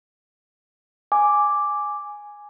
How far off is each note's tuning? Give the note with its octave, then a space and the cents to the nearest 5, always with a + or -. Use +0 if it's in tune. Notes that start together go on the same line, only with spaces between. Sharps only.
G#5 +0 D6 +0